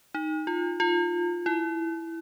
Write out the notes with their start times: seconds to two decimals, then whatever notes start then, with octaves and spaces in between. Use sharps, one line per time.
0.15 D#4
0.47 F4
0.80 F4
1.46 E4